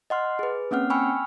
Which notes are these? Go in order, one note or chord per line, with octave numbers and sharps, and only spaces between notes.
D#5 F#5 C6 F6
G#4 B4
A#3 C4 C#4 F#5 F6
G5 G#5 B5 C#6 E6 F6